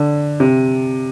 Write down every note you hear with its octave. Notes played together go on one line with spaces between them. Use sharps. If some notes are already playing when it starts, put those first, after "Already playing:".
Already playing: D3
C3